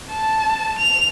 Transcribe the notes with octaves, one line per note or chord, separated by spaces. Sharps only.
A5
F7